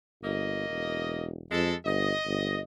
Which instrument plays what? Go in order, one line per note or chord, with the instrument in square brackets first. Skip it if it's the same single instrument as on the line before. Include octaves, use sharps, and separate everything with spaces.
[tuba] G1 [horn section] A#3 D#5
[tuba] E1
[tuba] F2 [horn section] G#3 A4
[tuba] G1 [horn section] D#5
[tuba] G1